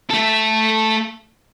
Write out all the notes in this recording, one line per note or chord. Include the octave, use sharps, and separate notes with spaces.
A3 A4